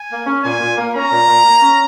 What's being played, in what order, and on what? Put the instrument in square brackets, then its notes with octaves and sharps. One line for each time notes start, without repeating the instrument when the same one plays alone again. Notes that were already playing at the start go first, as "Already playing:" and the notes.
Already playing: [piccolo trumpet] G#5
[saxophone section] A#3
C#4
[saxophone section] A#2 [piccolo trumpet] G#5
[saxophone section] A#2
A#3
[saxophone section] C#4 [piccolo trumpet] A#5
[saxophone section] A#2
A#2
A#3
C#4